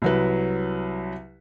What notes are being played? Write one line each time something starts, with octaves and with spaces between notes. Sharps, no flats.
C2 F#3 B4